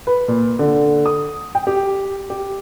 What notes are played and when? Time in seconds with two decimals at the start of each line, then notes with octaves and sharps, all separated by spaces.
0.07 B4
0.28 A#2
0.59 D3
1.06 D#6
1.55 G5
1.67 G4
2.30 G4